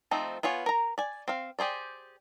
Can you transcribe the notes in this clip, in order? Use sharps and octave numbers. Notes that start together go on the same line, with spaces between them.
F3 A3 C4 D#4
B3 F4 C#5 G#5
A#4 A#5
D5 G#5
C4 F5
G4 G#4 C5 D5